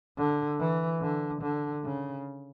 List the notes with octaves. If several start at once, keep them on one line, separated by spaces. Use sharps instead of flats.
D3
E3
D3
D3
C#3